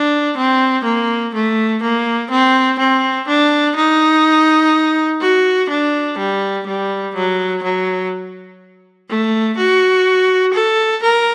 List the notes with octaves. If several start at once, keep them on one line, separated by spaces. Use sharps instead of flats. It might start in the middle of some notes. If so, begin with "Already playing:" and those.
Already playing: D4
C4
A#3
A3
A#3
C4
C4
D4
D#4
F#4
D4
G3
G3
F#3
F#3
A3
F#4
A4
A#4